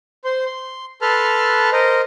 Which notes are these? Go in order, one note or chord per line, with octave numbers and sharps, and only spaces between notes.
C5 C6
C6
A4 B4 A5 C6 F6
A#4 C5 D#5